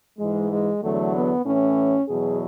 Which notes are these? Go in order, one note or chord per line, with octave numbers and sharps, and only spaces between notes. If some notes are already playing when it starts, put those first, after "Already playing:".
G#2 E3 G#3
G#3
E2 D3 F#3 A3
B3
A2 E3 C#4
E2 B2 F#3 G#4